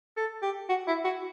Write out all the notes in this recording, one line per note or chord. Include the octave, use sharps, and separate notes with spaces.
A4
G4
F#4
E4
F#4